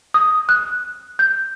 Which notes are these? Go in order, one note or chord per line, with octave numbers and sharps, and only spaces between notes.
D#6
F#6
G6